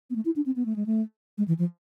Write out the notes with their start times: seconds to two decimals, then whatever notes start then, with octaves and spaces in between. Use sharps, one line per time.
0.10 B3
0.16 A3
0.25 E4
0.36 D4
0.46 C4
0.56 B3
0.66 A3
0.76 G#3
0.86 A3
1.38 G#3
1.48 E3
1.59 F3